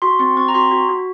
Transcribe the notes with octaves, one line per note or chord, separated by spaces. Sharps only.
F#4 C6
C4 C6
C4 C#6
A#5
F#4 C6
F#4
F#4